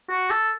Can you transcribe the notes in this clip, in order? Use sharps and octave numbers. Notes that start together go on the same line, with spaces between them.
F#4
A4